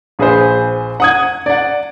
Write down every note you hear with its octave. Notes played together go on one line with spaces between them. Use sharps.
A#1 G#4 B4 C5
F#5 D#6 G#6
D5 F#5